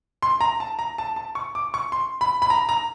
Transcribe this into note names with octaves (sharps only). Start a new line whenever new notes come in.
C6
A#5
A5
A#5
A5
A5
C#6
D6
C#6
C6
B5
B5
A#5
A#5